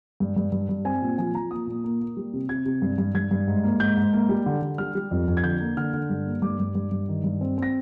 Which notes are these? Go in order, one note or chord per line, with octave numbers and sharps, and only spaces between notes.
G2
G2
G2
G2
C4 G#5
A#2
F3 G#5
F3 A#5
A#3 D#6
A#2
A#3
A#3
G3
C3
C3 G#6
C3
G2
G2
G2 G#6
G2
G#2
A#3
G#2 G6
G#2
A#3
G3
D3
D3
G3 F6
G3
F2
F2
G#6
D3 G6
A#3
D3 F6
D3
G2
A#3
G2 D6
G2
G2
G2
D#3
G2
C4
C4 A#6